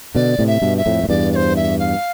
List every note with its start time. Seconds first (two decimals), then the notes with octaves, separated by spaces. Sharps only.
0.15 B2 D3 D5
0.39 A2 C3
0.47 E5
0.62 G2 B2
0.77 E5
0.86 F2 A2
1.04 A2
1.09 E2 G2 D5
1.32 D5
1.36 C5
1.56 E5
1.79 F5